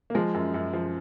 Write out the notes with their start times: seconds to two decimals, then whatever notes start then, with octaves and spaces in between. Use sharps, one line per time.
0.10 A#3
0.15 F3 G#3
0.34 F#2
0.54 F#2
0.73 F3